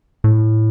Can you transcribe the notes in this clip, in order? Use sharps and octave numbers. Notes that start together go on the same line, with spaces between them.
A2